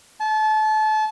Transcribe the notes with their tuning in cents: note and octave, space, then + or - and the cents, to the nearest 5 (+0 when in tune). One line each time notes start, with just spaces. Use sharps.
A5 -30